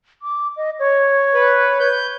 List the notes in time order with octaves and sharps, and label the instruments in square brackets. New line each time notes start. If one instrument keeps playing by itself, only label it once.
[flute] D6
D#5
C#5
[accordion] B4
G6